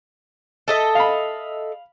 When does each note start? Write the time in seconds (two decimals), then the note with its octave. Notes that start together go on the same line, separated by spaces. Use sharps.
0.68 A4 D#5 E5
0.95 F5 B5